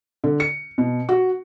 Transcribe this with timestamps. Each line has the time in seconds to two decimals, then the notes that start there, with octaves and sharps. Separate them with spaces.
0.24 D3
0.40 C#7
0.78 B2
1.09 F#4